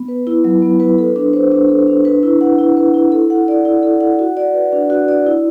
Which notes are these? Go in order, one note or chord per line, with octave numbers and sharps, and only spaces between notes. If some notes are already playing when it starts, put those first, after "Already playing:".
Already playing: B3
B4
E4
F#3
B3
B4
A4
D4
C5
D4
A4
D4
B4
E4
F#5
E4
B4
E4
A4
F#5
D5
E4
A4
F#5
F#4
D5
B4
D4
F#4
D5
E4